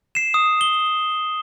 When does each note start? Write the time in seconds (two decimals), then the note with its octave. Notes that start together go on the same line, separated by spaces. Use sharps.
0.15 C7 E7
0.34 D#6
0.61 G7